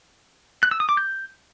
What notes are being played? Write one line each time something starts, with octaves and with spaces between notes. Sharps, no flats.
F#6
E6
D#6
D6
G6